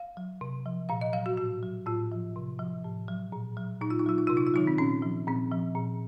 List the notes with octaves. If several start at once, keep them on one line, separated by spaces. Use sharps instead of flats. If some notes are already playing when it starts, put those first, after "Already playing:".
Already playing: F5
F#3
C3
F3
A#2 F5
D#5
F#3 F5
F#4
A2 F#4
F#3
A2 F4
F3
C3
F3
A2
F#3
A#2
F#3
A#2 D#4
F4
D#4
F#3 F4
D#4
C3 F4
D#4
F4
D#3 F#3 D#4
C4
A#2 C#4
F3
A#2 C4
F3
A#2